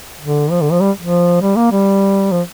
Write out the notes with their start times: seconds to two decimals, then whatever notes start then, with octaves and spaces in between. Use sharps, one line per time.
0.21 D3
0.51 F3
0.61 D3
0.72 F3
0.81 G3
1.01 F3
1.42 G3
1.56 A#3
1.72 G3
2.32 F3